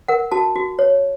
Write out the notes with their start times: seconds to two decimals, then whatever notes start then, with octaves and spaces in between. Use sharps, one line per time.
0.08 A#4 F#5
0.32 F#4 A5
0.56 F#4
0.79 C#5